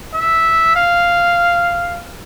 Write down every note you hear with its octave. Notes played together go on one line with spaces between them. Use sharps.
E5
F5